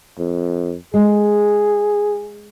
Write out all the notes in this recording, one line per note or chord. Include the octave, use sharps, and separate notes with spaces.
F2
G#3 G#4